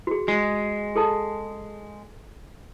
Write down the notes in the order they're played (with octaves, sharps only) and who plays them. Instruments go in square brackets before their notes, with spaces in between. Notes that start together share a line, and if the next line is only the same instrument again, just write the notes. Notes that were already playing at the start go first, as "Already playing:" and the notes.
[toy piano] F#4 G#4
[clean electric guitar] G#3 [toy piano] F#4
[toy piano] G#4 A4 A5